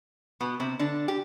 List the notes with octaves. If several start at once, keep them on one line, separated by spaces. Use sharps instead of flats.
B2 B3
C3 C4
D3 D4
G4